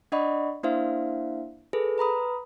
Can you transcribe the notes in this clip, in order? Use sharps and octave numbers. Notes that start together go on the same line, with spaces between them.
D4 D5 D#5 F#5 B5 C#6
A#3 D4 E4 C5 E5 F5
G#4 A4 B4
B4 A#5 B5 D#6